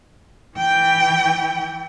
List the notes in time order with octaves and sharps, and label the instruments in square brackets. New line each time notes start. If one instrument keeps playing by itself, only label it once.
[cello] E3 G5